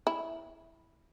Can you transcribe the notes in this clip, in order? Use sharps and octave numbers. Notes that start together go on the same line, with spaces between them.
E4